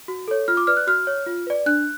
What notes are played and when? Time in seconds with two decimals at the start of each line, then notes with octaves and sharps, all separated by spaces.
0.08 F#4
0.28 A4 C#5
0.48 F4 F6
0.57 D6
0.67 B4 D5 F6
0.77 F#6
0.87 F#4 F6
1.07 C#5
1.26 F4
1.47 B4 D5
1.66 D4 F#6